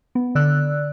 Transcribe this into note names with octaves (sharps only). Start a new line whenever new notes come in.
B3
D3 D5 E6 F#6